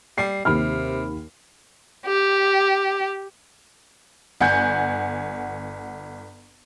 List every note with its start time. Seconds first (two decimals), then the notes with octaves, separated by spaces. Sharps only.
0.18 G3 C7
0.45 D#2 C3 B5 F6
2.06 G4
4.41 G1 F#5 G#5 G6